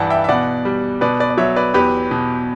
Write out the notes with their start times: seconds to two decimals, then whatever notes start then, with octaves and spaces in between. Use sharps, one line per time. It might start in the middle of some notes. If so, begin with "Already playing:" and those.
Already playing: G2 E3 D5 F#5 A5
0.10 E5 G5
0.24 E5
0.29 B2 D5 F#5
0.65 G3
1.01 B2 B4 D5
1.20 B4 D5
1.30 D5
1.37 F#3 C#5 E5
1.56 B4 D5
1.74 E2 G4 B4
2.11 B2